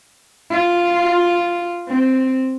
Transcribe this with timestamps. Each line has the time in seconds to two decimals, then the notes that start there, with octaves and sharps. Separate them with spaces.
0.50 F4
1.88 C4